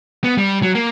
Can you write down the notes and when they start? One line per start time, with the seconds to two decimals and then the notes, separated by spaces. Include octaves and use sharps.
0.24 B3
0.38 G3
0.63 F#3
0.75 A#3